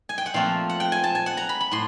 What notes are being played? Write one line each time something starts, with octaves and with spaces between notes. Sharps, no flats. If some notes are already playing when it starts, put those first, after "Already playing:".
G#5
G5
F#5
A#2 F3 A3 C4 F5
F#5
G5
G#5
A5
G#5
F#5
A#5
B5
B5
A2 C6